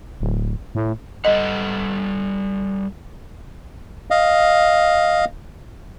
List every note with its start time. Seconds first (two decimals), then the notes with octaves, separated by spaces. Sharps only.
0.21 D1
0.75 A2
1.25 G3 A4 D#5 F#5
4.10 D#5 F5